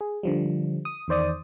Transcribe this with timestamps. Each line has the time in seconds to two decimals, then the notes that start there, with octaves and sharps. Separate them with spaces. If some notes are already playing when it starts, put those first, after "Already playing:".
0.01 G#4
0.23 D3 F3 G3
0.85 D#6
1.08 E2 D#3 C5 D5 D#6